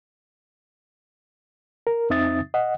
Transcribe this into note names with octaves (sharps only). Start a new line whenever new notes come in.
A#4
F2 C4 D#4 E5 D#6 A6
D#5 F#5